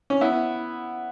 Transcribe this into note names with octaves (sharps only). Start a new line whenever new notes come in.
C#4
B3 E4